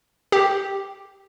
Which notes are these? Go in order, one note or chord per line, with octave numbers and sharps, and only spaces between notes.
G4